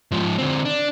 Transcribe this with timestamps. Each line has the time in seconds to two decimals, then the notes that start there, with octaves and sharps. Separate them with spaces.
0.11 G#2 F3
0.38 D3 C4
0.65 D4